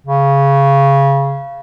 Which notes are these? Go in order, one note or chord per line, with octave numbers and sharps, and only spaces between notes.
C#3